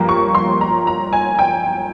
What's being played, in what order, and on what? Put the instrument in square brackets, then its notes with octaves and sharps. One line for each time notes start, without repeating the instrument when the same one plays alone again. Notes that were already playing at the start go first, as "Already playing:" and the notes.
Already playing: [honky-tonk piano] G2 F3 A#3
C#6
C6
A#5
A#5
G#5
G5